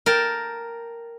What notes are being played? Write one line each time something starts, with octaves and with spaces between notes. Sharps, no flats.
A#4 G5 A5